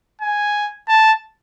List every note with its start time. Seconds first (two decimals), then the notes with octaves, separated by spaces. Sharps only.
0.21 G#5
0.88 A5